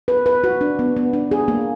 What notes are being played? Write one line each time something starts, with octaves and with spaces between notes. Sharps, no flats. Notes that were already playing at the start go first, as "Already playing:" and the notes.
B4
B4
F#4
D4
B3
B3
D4
G#4
A#3